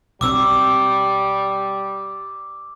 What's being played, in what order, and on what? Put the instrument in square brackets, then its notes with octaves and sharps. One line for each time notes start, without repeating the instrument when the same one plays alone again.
[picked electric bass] B1 D#3 C4 [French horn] G3 [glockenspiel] D6 E6